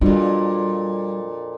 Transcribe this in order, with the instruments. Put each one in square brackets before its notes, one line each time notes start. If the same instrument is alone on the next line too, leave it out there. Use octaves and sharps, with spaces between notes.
[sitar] F2 A#2 [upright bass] G3 [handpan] D4 F4 F#4